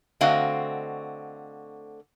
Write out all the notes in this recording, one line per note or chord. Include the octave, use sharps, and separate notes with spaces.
D3 A3 C4 F#4 D#5 F5